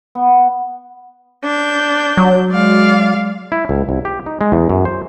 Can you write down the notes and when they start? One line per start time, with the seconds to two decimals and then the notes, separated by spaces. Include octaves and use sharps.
0.15 B3
1.44 D4 G6
2.17 F#3
2.49 G#3 D5 F5
3.52 E4
3.69 C#2
3.89 C2
4.05 G4
4.26 D#4
4.41 G#3
4.52 E2
4.69 F#2
4.85 C5